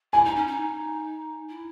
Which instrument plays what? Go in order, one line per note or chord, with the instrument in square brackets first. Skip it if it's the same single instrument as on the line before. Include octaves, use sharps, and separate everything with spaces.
[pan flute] E4 [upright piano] G#5
[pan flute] D#4
C#4
D#4
E4